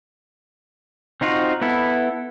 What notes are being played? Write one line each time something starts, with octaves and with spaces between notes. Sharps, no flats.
C4 D#4 F4 F#4
B3 E4 A4